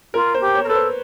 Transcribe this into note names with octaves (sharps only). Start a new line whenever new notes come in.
F4 A#4
C5
G4
C#5
A#4
A4 B4
C5